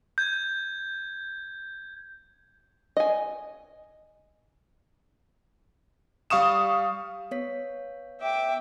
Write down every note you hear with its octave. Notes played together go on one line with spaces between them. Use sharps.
G6 G#6
D#5 G#5
G3 F5 C#6 D#6 E7
B3 C#5 B6
E5 G5 D6